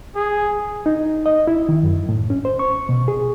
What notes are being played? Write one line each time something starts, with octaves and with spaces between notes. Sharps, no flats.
G#4
D#4
D#5
E4
D#3
F#2
A2
C#4
C5
C#6
B2
G#4